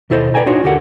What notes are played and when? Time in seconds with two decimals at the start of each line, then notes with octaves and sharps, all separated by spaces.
0.10 D#2 B2 E4 A4 C5 D#5
0.34 B4 D5 E5 G5 G#5 A#5
0.46 D4 D#4 F4 F#4 C#5
0.64 D2 D3 G4 A4 A#4 F#5